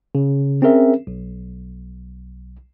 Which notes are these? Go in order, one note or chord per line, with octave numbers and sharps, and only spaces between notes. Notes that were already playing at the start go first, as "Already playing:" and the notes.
C#3
C4 C#4 G#4 A#4 E5
B1